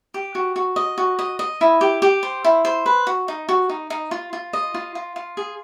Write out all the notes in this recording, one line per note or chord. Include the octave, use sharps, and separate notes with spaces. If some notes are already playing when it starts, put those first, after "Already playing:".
G4
F#4
F#4
D#5
F#4
D#5
D#5
E4
G4
G4
C5
E4
C5
B4
F#4
D#4
F#4
D#4
D#4
F4
F4
D#5
F4
F4
F4
G#4